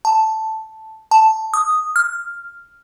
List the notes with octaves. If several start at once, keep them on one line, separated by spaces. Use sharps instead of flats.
A5
A5
D#6
F6